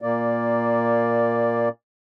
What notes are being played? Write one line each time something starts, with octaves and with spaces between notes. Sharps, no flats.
A#2 A#3 D5